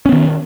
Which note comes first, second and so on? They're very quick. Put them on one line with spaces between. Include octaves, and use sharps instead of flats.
C#4 B3 D#3